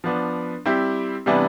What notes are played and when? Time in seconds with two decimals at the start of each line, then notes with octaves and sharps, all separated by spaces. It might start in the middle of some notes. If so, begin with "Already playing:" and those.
0.04 F3 B3 D4
0.66 G3 C4 E4 G4
1.26 C3 E3 G3 B3 D4